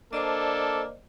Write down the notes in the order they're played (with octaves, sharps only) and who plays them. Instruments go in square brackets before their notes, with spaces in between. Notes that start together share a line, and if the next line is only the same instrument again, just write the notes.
[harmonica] A#3 [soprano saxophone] D4 [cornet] A4 [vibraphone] C5 D5 D#5